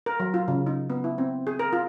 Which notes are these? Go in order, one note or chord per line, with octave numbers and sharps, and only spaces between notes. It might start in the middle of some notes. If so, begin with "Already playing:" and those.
A#4
F#3
F4
C#3
D#4
B3
E4
C4
G#4
A#4
F4